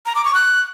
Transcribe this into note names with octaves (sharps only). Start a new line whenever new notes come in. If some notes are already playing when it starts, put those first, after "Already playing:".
A#5
D6
C#6
F#6